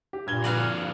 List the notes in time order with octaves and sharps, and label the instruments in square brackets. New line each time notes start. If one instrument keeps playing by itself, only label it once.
[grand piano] G4
[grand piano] G2 G#6 G7 [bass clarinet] A#2
[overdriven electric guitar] F2 D3 [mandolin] F#4 B4 F5